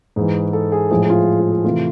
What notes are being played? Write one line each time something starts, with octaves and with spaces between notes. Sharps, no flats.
G#2 E3 G#3 G#4
A4
G#4
A2 F3 G#3 G#4
G#4
F4
F4
G#4
C3 E3 A3 F4